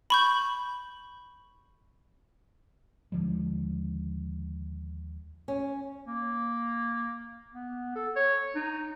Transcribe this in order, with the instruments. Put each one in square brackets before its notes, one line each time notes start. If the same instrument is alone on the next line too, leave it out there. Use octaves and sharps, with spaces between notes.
[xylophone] B5 C#6 G6
[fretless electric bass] D#2 D3 F3 G#3
[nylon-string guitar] C#4
[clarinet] A#3
B3
A4
C#5
D#4